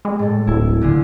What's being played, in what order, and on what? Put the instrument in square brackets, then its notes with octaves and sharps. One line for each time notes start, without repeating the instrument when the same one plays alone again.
[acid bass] G#3
[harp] A2 A4
[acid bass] D1 [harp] E4
[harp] A#2 D3 G#4